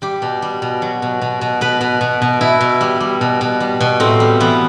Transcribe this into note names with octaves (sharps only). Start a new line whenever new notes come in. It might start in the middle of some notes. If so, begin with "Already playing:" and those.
G3 G4
B2
G3
B2
F#3
B2
B2
B2
B2 B4
B2
B2
B2
B2 E4
B2
G3
G3
B2
B2
G3
B2
A2 C4
G3
E3 B3